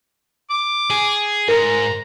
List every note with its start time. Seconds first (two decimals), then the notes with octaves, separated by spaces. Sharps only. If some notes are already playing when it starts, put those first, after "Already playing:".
0.50 D6
0.90 G#4
1.48 G#2 A#4 A#5